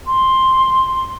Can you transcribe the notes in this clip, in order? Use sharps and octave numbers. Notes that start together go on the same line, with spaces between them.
C6